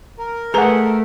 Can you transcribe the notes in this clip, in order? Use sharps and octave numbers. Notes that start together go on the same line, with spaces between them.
A#4
A3 G#4 B4 F#5 A#5